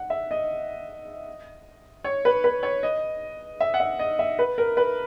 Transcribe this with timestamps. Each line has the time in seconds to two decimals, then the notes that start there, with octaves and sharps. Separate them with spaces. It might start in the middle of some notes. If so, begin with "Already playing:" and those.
Already playing: F#5
0.10 E5
0.31 D#5
2.04 C#5
2.25 B4
2.44 B4
2.63 C#5
2.83 D#5
3.60 E5
3.74 F#5
3.80 E5
3.99 D#5
4.19 E5
4.39 B4
4.58 A#4
4.77 B4